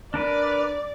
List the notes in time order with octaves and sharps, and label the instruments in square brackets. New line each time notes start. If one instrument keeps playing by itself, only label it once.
[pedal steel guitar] D4 A#4 B4 [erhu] D5